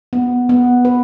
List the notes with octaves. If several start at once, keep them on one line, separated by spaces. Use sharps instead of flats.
B3
B3
B4